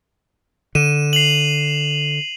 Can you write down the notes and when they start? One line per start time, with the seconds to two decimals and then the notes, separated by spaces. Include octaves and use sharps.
0.75 D3 D#7 E7
1.13 C7 F7 F#7